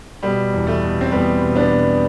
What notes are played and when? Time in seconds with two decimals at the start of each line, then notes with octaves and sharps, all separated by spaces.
0.22 B2 G3
0.53 E2
0.67 A3
0.82 B2
1.01 C4
1.12 E2 G3 B3
1.41 B2
1.56 B3 D4
1.71 B2